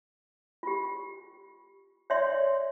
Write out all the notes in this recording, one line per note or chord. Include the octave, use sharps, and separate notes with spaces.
F4 G4
C#5 D5 E5 C6